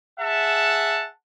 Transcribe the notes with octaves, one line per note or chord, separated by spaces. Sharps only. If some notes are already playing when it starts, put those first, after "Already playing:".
G#4 E5 F#5 A5